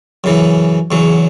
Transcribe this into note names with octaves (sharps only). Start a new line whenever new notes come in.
F#2 C#3 E3
E2 C#3 F#3